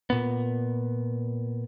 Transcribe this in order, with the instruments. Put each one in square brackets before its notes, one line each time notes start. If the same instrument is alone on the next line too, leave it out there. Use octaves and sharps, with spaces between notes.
[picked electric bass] A#2 B3